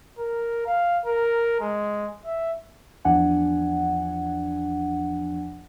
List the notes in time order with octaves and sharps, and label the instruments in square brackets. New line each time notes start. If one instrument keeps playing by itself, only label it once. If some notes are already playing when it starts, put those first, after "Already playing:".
[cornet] A#4
F5
A#4
G#3
E5
[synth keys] E2 F3 D4 F#5 G#5